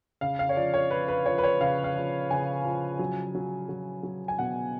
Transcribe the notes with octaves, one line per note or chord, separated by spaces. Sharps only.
C#3 F5
F5
C#5
F3 D5
C#5
F3 B4
B4
F3 C#5
B4
C#5
C#3 F5
F5
F3
C#3 G#5
F3
F#3
F#3
F#3
F#3
G#5
B2 F#5